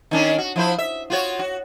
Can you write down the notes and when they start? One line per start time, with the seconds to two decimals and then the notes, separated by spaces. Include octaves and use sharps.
0.11 D#3 C#4 D4
0.38 F#4
0.56 F3 E4 C5
0.78 E5
1.10 F4 F#4 C#5
1.39 F#4